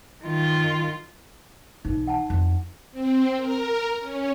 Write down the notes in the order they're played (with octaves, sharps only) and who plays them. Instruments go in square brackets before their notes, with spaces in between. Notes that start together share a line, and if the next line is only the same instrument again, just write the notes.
[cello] D#3 F4
[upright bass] B1 E3 [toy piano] D#4
[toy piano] F#5 G#5 A5
[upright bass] F2
[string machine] C4
A#4
C#4